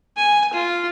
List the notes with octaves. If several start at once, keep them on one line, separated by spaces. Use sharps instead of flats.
G#5
F4